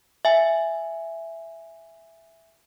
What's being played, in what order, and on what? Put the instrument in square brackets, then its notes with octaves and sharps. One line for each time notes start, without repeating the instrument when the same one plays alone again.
[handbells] E5 G#5